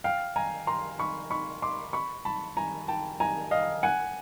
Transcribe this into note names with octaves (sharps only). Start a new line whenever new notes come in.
F5 G5
G#5 A#5
A#5 C6
B5 C#6
B5 C#6
C6 D6
B5 C#6
A5 B5
G#5 A#5
G5 A5
G#5 A#5
D#5 F5
F#5 G#5